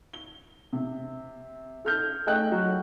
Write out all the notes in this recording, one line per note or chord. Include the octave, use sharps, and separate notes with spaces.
G7
C3
A4 F6 G6
A3 G#4 D#5 G5 F#6
F#3 F#4